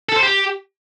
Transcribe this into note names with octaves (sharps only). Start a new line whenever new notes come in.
A4
C5
G4